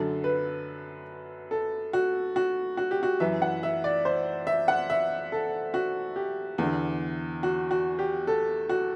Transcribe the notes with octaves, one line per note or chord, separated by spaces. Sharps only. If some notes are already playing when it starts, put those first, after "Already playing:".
Already playing: F#2 D3 A4
B4
A4
F#4
F#4
F#4
G4
F#4
F#2 E3 E5
F#5
E5
D5
C5
E5
F#5
E5
A4
F#4
G4
E2 D3
F#4
F#4
G4
A4
F#4